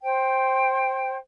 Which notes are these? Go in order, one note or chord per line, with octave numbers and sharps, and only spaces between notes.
C5 G5